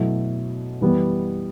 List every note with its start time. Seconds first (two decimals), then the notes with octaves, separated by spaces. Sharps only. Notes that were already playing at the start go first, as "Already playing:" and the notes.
Already playing: B2 F#3 A3 E4
0.81 E3 G3 B3